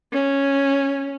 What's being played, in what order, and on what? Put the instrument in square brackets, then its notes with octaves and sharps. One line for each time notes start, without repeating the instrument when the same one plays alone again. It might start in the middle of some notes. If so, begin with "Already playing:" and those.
[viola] C#4